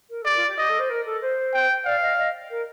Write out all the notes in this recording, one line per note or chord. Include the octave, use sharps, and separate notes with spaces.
A#4
A4
G4 D5
F4
G4
G4 D#5
A4
C5
A#4
A4
C5
G5
D5 F5
D#5
D#5
A#4